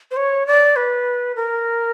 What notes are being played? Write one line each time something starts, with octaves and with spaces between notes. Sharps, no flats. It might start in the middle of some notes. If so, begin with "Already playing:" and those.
C5
C#5
D5
B4
A#4